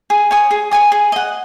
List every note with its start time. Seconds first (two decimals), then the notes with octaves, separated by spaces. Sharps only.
0.10 G#4
0.31 C#5 G#5 D#6
0.51 G#4
0.71 C#5 G#5 D#6
0.92 G#4
1.12 D#5 F#5